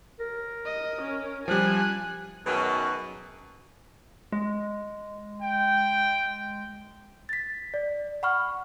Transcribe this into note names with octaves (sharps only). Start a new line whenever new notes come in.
A#4
D#5
C#4
F3 G3 G#5 F#6
F#2 B2 D#3 F#3 G#4 B4
G#3
G5
A6 B6
D5
F#5 B5 C#6 F6